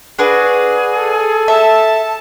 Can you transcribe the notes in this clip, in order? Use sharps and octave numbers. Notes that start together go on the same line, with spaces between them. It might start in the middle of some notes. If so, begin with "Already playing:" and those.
D4 F#4 G#4 B4
A4
E5 A5